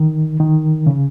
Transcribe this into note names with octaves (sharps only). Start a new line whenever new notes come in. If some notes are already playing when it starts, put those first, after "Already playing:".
Already playing: D#3
D#3
C#3